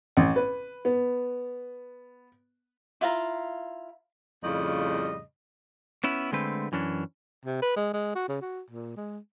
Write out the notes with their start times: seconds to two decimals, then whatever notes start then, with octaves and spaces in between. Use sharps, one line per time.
0.17 A1
0.36 B4
0.85 B3
3.01 E4 F4 F5 A#5
4.43 F2 A2 C#3 G3 D#5
6.04 B3 C#4 E4
6.32 D3 G#3 A3 C4 B4
6.72 F#2 E3 C#4 D4
7.46 C3
7.62 B4
7.76 G#3
7.94 G#3
8.15 F#4
8.29 C#3
8.41 F#4
8.70 A#2
8.97 G#3